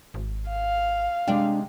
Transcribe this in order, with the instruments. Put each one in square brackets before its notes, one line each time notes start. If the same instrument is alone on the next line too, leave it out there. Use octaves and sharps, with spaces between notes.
[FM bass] G#1
[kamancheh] F5
[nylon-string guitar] C3 G#3 G5 [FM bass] D4